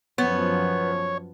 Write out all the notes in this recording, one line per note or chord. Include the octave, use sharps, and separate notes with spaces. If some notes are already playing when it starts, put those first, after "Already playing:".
F#2 F3 B3 C#5